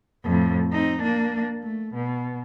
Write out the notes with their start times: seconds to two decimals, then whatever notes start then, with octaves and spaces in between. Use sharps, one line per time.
0.24 F2 A2
0.71 C4 D#4
1.01 A#3 D4
1.63 A3
1.94 B2